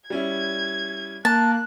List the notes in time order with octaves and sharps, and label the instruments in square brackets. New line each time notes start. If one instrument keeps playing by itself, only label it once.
[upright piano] G3 C#4 E4 [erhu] G#6
[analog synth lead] A#3 [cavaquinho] A5 [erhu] F#6